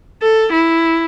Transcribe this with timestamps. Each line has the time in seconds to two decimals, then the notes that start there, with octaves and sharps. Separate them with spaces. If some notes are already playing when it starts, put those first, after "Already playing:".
0.22 A4
0.52 E4